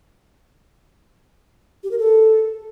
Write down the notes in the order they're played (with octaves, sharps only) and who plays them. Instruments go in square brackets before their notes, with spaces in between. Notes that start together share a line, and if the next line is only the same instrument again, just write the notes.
[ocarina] G4
A#4
A4